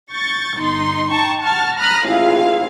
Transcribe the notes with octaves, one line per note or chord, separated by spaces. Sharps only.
C#6 G6 A6
G1 D#4 C6
D#4 G5 A5 A#5 C#6
F#5 A5 C#6 F6 A6
A#5 B5 D#6 F6 F#6 A#6
A1 D#2 E4 F4 G#4 F5